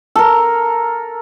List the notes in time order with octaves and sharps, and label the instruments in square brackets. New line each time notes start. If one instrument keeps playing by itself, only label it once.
[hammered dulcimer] A4 A#4